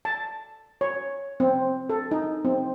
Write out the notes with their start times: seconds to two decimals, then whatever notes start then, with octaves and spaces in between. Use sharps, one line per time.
0.05 A5
0.81 C#5
1.40 C4
1.90 A4
2.11 D#4
2.45 C4